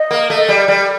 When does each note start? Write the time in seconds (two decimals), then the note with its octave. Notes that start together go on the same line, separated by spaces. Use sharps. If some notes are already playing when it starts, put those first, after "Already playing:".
Already playing: D#5
0.11 A#3
0.30 A3
0.48 G3
0.68 G3